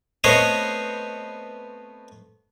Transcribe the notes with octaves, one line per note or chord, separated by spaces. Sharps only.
A3 B3 C4 C5 C#5 D#5